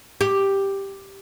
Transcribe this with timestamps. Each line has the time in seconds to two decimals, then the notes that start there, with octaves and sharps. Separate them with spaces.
0.21 G4